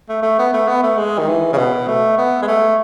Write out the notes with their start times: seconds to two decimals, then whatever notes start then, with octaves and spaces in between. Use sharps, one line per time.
0.09 A3
0.23 A3
0.38 B3
0.53 A3
0.68 B3
0.83 A3
0.97 G#3
1.18 D#3
1.28 E3
1.53 C#3
1.57 B2
1.87 A3
2.18 B3
2.42 G#3
2.47 A3